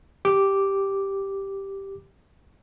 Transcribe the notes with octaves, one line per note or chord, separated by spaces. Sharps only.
G4 D6